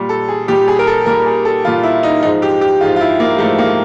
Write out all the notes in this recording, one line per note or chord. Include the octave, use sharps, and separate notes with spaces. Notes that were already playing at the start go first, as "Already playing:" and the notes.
Already playing: A#2 G3
A4
G#4
A#2 G3 G4
G#4
A#4
A4
A#2 G3 A#4
G#4
A4
A#2 G3 F4
E4
D#4
G#2 F3 G#3 D#4
G4
G4
G#2 F3 G#3 F4
F4
E4
A#3
G#2 F3 G#3 A3
A#3